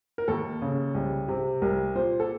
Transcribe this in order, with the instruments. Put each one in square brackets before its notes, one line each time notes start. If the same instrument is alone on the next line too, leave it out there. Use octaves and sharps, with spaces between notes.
[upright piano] A#4
D#2 A4
C#3
C2
C3
C2 A#4
A#2 C5
A4